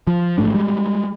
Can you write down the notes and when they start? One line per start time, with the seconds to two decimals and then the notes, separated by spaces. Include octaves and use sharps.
0.07 F3
0.38 A1 G#2 A3 D4
0.54 G3 G#3